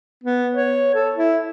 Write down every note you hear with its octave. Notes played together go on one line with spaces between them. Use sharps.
B3
C#5
A4
E4